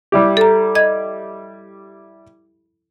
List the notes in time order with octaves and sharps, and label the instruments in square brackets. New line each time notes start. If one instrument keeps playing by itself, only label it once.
[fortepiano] G3 E4 G4
[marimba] A4 A#5
D#5 G#6